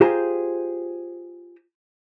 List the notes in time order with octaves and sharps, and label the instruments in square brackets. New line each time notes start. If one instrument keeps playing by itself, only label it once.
[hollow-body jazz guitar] F4 G4 G#4 C5 A#5